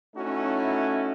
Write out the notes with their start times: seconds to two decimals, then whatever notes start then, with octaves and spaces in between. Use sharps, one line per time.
0.15 A3 C#4 D#4 E4 F#4